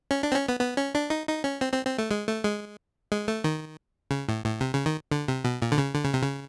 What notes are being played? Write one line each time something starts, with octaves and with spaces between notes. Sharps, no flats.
C#4
D4
C4
C#4
B3
B3
C#4
D4
D#4
D#4
C#4
C4
C4
C4
A3
G#3
A3
G#3
G#3
A3
D#3
C#3
A2
A2
C3
C#3
D#3
D3
C3
B2
A#2
D3
C#3
D3
C#3
C3
C#3